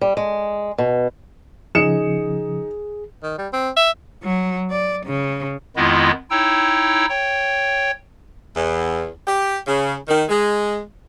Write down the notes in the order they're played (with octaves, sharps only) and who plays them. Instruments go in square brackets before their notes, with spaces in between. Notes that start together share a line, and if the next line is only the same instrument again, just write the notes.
[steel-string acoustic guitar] G3
G#3
B2
[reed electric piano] C#3 F3 [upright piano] D#4 C#7 E7 [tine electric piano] G#4
[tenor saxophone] D#3
G3
C4
E5
[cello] F#3
D5
C#3
[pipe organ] F2 D#3 G#3 B3 E4 F4
D#4 E4 C#5 G5 E6
C#5 G5
[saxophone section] E2
G4
C#3
D#3
G#3